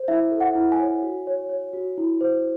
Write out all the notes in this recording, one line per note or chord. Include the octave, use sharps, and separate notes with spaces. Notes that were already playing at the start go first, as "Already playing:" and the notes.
Already playing: C5
E4 E5
A4
F#5
E4
G#5
C#5
F#4
C#5
C#5
F#4
E4
C5